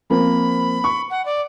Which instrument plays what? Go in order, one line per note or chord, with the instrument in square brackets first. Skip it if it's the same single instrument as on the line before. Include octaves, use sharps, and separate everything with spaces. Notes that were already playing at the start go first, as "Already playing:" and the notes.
[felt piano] F3 A#3 C4 [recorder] B5
[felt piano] C#6
[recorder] F#5
D5